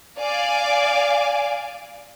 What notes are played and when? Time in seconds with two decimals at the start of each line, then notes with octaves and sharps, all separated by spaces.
0.19 D5 F5 G#5